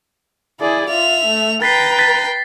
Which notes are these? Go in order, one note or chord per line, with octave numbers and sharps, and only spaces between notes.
E4 G#4 D5
F4 E5 F7
A3
B4 G5 A#5 A6 B6 C7
A6 B6